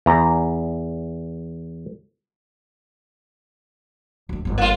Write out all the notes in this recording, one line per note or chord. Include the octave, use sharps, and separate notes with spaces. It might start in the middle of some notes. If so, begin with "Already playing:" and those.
E2 A#5
D2 A3
G1 G#2
A#3 F4